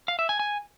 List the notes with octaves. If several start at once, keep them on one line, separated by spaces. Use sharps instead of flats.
F5
E5
G#5
G#5